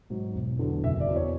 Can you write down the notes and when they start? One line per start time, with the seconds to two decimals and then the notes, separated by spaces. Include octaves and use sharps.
0.10 G#2 F#3
0.35 E1
0.59 E2 D3 F#3
0.84 F#1 E5
1.00 D5
1.08 E2 B2
1.16 C#5